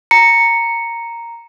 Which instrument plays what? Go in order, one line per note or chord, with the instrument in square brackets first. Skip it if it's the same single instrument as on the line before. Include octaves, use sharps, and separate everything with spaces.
[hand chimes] A#5 C#7